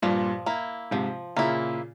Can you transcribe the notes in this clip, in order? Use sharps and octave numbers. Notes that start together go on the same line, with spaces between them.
G2 A#2 F3
A#3 E4
G#2 C3 F3
A#2 C#3 A#3 E4